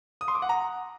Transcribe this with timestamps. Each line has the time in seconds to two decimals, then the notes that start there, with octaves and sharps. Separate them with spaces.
0.21 D#6
0.28 C6
0.35 D6
0.42 F#5
0.49 A#5